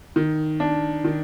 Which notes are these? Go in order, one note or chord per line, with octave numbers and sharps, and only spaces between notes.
D#3
D4
D#3